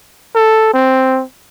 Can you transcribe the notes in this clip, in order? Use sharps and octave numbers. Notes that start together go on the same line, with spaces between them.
A4
C4